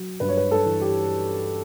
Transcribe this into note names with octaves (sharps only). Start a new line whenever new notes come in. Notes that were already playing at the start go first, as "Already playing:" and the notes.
Already playing: F#3
G2 B4
C#5
B4
A4
E3
G4